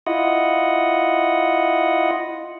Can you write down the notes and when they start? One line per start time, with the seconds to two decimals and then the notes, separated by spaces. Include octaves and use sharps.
0.07 E4 F4 D#5 F#5